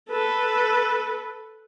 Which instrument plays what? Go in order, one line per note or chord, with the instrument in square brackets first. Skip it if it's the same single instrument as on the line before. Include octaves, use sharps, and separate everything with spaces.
[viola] A4 B4